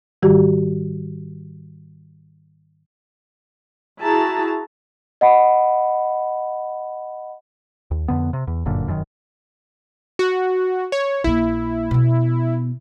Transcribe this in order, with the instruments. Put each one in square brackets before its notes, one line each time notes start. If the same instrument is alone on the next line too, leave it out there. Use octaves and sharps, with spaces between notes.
[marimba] G#2 D#3 G3 F#4 G4
[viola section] E4 F#4 G#4 A5 A#5
[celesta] D#5 F#5 B5
[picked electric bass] D#2
F2 D3 B3
C3
E2
G1 F#2 A#2 D3
F1 F#2 A2 D#3
[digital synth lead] F#4
C#5
[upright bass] A#1 A#3 [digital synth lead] E4
[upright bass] B2 B3